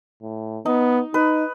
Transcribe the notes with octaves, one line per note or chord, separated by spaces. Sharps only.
A2
B3 D#4
D#4 B4